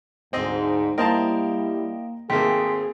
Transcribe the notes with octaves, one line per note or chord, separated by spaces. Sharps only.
D2 G#2 C4 D#5
G3 A#3 E4 A#4 C5 D#5 G5 A5
G#1 A3 A#3 C4 G#4 G5 C6 B6